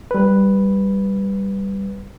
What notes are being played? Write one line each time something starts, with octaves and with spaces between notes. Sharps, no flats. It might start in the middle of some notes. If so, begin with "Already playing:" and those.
G3 B4